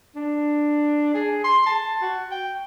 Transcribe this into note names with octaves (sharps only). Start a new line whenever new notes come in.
D4
G#4
C6
A5
F#4
G5